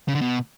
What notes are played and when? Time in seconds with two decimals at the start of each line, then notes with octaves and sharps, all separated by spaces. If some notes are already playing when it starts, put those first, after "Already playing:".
0.08 C#3
0.15 D3
0.21 B2